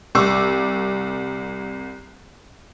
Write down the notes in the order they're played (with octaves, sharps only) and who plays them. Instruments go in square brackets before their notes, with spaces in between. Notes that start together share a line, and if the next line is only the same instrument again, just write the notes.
[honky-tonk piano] C2 C#6 D6 E6